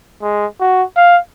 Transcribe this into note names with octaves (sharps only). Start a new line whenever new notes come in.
G#3
F#4
F5